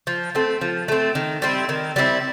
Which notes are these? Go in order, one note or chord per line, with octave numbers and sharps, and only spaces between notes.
F3
A3 C4
F3
A3 C4
D#3
G3 C4 E4
D#3
G3 C4 E4